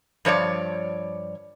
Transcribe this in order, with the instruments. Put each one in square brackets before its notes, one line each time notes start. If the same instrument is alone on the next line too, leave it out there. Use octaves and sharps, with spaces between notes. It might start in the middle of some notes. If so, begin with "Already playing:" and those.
[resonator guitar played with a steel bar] G2 F3 C#5 D5